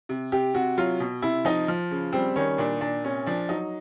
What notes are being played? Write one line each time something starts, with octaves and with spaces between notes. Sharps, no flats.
C3
C3 G4
C3 F#4
F#3 F4
B2
C3 E4
F3 D#4
F3
C#3
G3 C4
D#3 C#4
A#2 D4
A#2 D4
C3 C#4
F3 D4
F#3 D#4